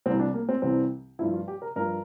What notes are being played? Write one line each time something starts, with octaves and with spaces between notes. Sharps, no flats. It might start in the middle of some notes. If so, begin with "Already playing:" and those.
C2 C3 E3 G3 C4
D4
A#3
C4
C2 C3 E3 G3 C4
G2 F3 E4
F4
G4
A#4
G2 F3 A#4